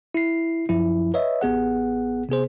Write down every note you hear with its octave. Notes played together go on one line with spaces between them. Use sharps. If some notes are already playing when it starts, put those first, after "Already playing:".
E4 C7
F#2 F3 E4
B4 C#5 D#5 E5
A1 B3 G#4 F#5
C3 B3 G#4 C5